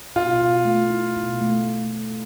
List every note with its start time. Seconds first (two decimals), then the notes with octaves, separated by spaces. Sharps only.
0.16 B2 F4
0.40 B2
0.65 A3
0.90 E4
1.16 B2
1.41 A3